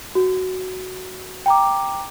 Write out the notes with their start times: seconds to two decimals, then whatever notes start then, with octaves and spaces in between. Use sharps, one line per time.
0.15 F#4
1.46 G5 A#5 D6